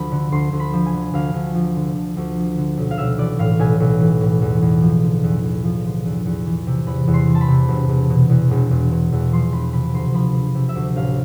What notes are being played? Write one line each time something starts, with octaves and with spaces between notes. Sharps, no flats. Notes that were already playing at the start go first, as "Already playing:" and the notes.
Already playing: D2 F3 B5
D3
D2 C6
D2
B5
F3
G#5
D3
D2 F5
D2
F3
D3
D2
D2
F3
D3
B1
F5
B1 E5
E3 D5
A2 F5
B1 G#5
B1
E3
A2
E2
E2
F3
D3
E2
E2
F3
D3
E2
E2
E3
C3
E2 B5
E2
C6
E3
A5
B5
C3
E1
E1
B2
E2
E1
E1
B2
E2
F3 C6
E1 B5
C3 B5
D2 C6
F3 B5
E1
C3
E5
D2
A1 F5